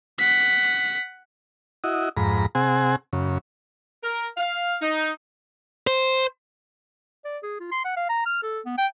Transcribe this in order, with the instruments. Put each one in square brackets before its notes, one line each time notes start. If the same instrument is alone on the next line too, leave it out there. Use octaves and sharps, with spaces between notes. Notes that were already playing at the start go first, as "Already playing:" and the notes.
[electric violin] F#5 B6
[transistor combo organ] E4 F#4 D#5
F2 G#2 A#5 B5
C3 C4 G#4 F#5 G#5
F#2 C#3
[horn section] A#4
F5
D#4
[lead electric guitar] C5
[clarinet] D5
G#4
F4
C6
F#5
F5
A#5
F6
A4
B3
G5